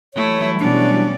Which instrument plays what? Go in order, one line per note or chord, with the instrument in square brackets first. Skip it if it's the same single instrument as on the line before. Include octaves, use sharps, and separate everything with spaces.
[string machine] E3 F#3 G3 [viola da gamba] A3 E4 [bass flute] C#5
[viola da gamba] B2 [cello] C#4 D5 [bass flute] D4